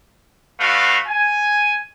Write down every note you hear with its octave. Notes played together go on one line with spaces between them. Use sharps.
A3 D4 F#4 B4 F5
G#5